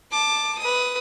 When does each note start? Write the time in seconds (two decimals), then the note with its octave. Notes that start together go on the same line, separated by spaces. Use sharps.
0.11 A5 D6
0.59 B4 D#6